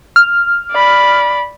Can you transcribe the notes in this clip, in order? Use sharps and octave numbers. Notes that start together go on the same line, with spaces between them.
F6
D5 B5